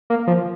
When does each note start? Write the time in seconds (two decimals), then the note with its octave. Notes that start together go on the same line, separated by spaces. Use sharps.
0.10 A#3
0.27 F3